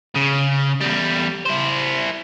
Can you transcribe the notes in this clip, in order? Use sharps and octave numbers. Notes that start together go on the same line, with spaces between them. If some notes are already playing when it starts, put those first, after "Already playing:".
C#3
E2 G3
E4 C5